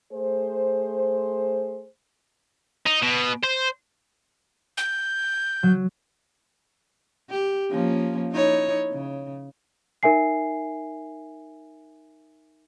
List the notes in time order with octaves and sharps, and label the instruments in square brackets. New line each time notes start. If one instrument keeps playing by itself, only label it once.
[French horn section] A3 G#4 C5
[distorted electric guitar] D#4
B2
C5
[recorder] G6
[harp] F#3
[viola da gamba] G4
F3 A#3 C#4
D#4 E4 C#5
C#3
[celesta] D#4 A#4 E5 G#5 C7